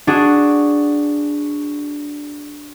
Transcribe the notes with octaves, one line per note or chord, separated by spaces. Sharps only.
D4 F#4 G#4